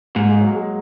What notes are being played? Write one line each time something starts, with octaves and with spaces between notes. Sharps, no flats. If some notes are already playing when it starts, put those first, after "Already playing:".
G#2 A#3
G#3
F#3
G#3